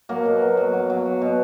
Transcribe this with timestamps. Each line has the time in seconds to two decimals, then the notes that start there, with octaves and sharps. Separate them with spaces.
0.09 F#3 A#3
0.25 B2
0.42 F#3
0.57 F#3
0.73 F#3
0.90 F#3
1.06 F#3
1.22 B2